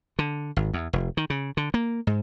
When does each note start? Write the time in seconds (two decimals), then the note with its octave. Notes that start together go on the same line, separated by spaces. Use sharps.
0.19 D3
0.56 G#1
0.73 E2
0.93 F1
1.17 D#3
1.30 C#3
1.57 D3
1.74 A#3
2.07 G#2